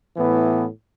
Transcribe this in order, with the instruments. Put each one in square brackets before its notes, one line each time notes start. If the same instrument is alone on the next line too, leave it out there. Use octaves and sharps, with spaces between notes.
[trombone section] A2 E3 B3